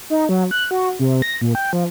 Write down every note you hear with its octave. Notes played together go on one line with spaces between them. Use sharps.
D#4
F#3
F#6
F#4
C3
A#6
A#2
G5
F3